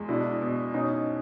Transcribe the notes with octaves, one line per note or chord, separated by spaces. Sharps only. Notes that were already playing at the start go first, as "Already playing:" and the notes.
Already playing: E2 G#3
B2 D4 E4
B2
B2 C#4 D#4